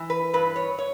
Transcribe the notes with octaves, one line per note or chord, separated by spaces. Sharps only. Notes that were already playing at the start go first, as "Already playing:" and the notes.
Already playing: E3
B4
G2 B4
C#5
C#5